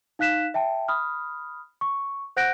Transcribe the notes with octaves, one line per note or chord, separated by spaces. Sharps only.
D#4 F5 F#6 B6 E7
E5 G5 A5
B5 D#6 F6
C#6
C5 F#5 F#6 G6 A#6 D7